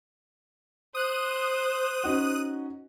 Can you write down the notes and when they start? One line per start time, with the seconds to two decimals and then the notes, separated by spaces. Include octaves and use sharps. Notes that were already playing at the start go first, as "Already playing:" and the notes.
0.95 C5 D#6 F#6 D#7
2.04 C#4 D#4 F#4